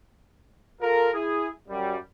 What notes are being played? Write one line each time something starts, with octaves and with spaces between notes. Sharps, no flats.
F4 A4 A#4
E4 G#4
F#2 G3